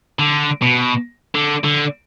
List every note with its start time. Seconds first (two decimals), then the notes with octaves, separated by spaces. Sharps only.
0.19 D3
0.62 B2
1.35 D3
1.64 D3